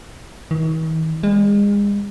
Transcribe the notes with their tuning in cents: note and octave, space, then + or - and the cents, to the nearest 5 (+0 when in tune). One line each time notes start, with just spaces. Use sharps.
D#3 +45
G#3 -35